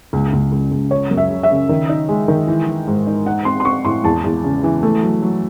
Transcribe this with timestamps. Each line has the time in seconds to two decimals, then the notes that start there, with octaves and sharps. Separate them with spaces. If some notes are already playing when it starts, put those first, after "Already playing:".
0.13 C#2
0.33 C#2
0.52 C#2
0.71 C#2
0.91 C#3 C#5
1.11 F#2
1.17 E5
1.30 C#3
1.43 E5
1.50 C#3
1.69 D#3
1.89 D#4
2.09 G#3
2.28 D#3
2.47 E3
2.67 E3
2.87 G#2
3.07 D#4
3.26 D#4 F#5
3.45 C4 C6
3.60 C6
3.65 C4 C#6
3.85 A2 C6
4.04 E2 A5
4.24 E2
4.44 C#3
4.64 E3
4.83 A3
5.03 F#3
5.22 F#3